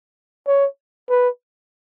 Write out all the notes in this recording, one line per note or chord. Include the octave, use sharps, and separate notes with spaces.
C#5
B4